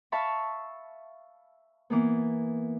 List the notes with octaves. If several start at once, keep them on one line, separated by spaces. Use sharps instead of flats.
E5 F5 A5 B5 C#6
E3 A#3 B3